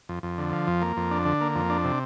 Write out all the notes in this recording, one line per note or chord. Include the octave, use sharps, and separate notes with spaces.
F2
F2
D3
F3
F2
A#3
F2
D4
D3
A#3
F2
D4
C3